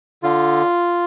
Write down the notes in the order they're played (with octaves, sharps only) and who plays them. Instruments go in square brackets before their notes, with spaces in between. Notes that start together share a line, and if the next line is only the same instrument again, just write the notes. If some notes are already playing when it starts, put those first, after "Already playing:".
[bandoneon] D3 F4